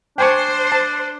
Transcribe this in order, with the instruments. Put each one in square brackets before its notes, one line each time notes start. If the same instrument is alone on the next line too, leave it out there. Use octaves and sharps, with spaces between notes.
[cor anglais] D4 [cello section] C5 [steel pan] G5 G#5 C#6
[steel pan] A5